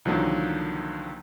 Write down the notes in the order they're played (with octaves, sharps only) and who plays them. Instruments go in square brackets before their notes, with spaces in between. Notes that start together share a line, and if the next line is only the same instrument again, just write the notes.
[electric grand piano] C2 D3 D#3 F3 F#3 A#3